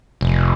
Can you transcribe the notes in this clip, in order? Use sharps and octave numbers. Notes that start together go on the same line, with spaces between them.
F1